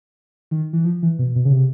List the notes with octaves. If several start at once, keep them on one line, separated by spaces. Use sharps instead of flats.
D#3
E3
F3
E3
B2
B2
C#3
C3